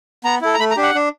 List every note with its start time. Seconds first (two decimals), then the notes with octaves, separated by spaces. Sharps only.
0.25 B3 A#5
0.42 E4 A4
0.54 A#5
0.59 A3 B5
0.71 A#5
0.77 D4 G4
0.83 F#5
0.95 D4